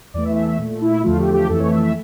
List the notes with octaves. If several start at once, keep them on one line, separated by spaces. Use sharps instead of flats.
E2 E3 A3 D5
E5
E5
E5
A#2 A3
E4
E2 D3 F3 A3 F4
G4
G4
F2 E3 A3 A4
C#5
E5
E5